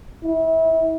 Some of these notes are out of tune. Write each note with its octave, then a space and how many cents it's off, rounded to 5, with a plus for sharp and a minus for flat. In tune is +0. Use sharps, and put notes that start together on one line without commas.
E4 -30